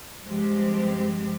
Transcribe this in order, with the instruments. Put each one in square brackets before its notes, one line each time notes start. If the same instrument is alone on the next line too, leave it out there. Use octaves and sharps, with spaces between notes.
[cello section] G2 F3 G#3 C4 G4